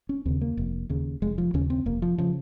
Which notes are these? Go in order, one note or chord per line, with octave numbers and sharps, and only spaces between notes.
C#4
D#2 C#3 C4
A#3
F1
D#2 C#3
F1 G#3
F3
D#2 C#3 C#4
C4
F1 A#3
F3
C#3 F3